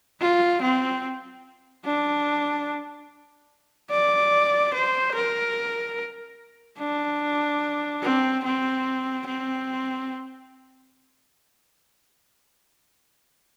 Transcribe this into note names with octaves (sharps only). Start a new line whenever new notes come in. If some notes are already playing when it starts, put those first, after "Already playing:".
F4
C4
D4
D5
C5
A#4
D4
C4
C4
C4